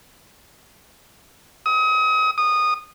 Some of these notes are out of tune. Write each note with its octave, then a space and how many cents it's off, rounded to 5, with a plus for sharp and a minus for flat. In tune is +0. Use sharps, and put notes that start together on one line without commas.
D#6 +35
D#6 -15